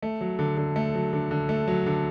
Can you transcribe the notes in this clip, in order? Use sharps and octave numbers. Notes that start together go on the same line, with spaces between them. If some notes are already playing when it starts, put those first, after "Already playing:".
A3
F#3
D3
D3
A3
F#3
D3
D3
A3
F#3
D3